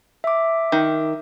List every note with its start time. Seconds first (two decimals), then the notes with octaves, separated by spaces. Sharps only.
0.24 E5 D6
0.72 D#3